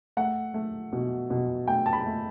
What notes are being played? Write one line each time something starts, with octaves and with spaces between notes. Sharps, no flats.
A3 F#5
A3
B2
B2
A3 G5
A5
B5
A3